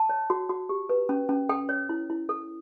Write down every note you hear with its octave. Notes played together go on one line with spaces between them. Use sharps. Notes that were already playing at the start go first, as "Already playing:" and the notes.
Already playing: A5
C#5
F#4
F#4
G4
B4
C#4
C#4
A4 G5
C#5
E4
E4
A4